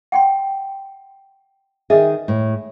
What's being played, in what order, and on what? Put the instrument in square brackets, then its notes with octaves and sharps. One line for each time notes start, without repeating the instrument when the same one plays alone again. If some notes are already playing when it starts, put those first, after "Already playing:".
[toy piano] F#5 G5 C6
[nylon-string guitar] D#3 G#4 [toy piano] B4 D#5 E5
[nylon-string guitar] A2